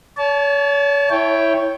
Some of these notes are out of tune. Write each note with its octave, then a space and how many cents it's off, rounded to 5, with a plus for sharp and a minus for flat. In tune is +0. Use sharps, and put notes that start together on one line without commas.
C#5 +35 A5 -25
E4 +0 C#5 +0 G5 +0